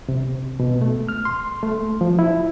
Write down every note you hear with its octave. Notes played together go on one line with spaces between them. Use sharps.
C3
B2
A3
F6
C6
A3
F3
E4